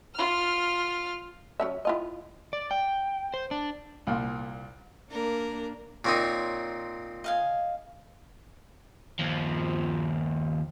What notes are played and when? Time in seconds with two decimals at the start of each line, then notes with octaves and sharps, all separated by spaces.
0.15 F4 F6
1.60 F#3 C#4 E5
1.85 E4 F4 D#5
2.53 D5
2.71 G5
3.34 C5
3.51 D4
4.07 C2 A#2
5.11 A#3 D4 A#4
6.05 A#2 C4 D#4 C#5
7.24 D#5 F5 G#5
9.19 D#2 F3